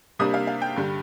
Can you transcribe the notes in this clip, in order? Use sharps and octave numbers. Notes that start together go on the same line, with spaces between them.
C3 G3 A#3 D4 D#6
F5
F5
G5
G2 D3 G3